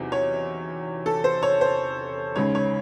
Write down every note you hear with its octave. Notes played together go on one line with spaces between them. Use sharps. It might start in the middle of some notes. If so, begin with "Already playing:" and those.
Already playing: E2 C3 F#3 C4 D#4
C#5
A4
C5
C#5
C5
C#2 C#3 G#3 D#4 C#5
C#5